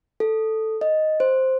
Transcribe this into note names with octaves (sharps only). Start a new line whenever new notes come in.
A4
D#5
C5